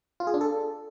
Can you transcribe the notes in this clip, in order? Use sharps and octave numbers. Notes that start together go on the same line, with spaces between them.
F4
G#4
D4
A4